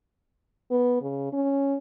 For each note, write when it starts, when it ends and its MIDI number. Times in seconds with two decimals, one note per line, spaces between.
0.71 0.99 59
1.02 1.30 49
1.33 1.76 61